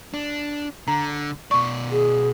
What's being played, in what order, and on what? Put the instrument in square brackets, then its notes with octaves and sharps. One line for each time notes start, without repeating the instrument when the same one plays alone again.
[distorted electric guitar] D4
[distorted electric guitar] D3 [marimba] A#5
[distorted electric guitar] B2 D5 [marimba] C#6
[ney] G#4